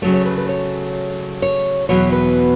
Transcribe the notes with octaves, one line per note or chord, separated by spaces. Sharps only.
C#3 F#3 A3 C#5
C#5
B4
B4
C#5
C#5
E2 B2 F#3 C#5
B4